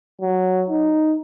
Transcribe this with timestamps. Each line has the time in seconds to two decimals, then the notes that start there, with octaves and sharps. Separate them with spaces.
0.21 F#3
0.70 D#4